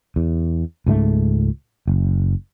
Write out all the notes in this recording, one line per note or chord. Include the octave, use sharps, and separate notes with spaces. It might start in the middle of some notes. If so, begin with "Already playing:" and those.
E2
C#2 G#2 G#3 A3
F#1